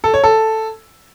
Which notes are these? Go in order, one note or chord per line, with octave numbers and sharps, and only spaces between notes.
A4
C#5
A4